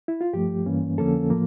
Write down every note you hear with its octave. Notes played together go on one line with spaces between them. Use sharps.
E4
F4
G2 F3 A3 G4
G2 E3 A#3 C#4
F2 D3 F3 A#3 C#4 A4
A2 F3 A#3